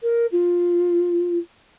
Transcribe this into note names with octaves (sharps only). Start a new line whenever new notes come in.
A#4
F4